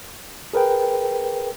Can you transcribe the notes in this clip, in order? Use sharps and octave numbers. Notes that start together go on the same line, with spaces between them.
G#4 A#4 B4 G5